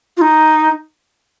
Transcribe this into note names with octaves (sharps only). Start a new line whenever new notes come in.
F4
D#4